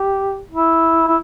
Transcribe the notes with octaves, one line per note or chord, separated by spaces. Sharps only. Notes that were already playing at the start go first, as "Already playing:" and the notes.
Already playing: G4
E4
E4